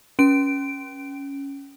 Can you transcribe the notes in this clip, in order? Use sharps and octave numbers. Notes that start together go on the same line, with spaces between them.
C#4 D7